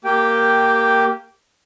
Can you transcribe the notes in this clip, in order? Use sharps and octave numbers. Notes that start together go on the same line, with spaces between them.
A#3 G4 G5